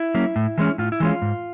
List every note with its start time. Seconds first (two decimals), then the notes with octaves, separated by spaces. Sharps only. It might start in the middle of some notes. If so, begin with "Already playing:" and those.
Already playing: E4
0.15 F#3 A#3 C#4
0.36 A2
0.58 E3 G#3 C#4
0.78 A2 F4
0.92 E4
1.00 E3 G#3 C#4 F4
1.22 G#2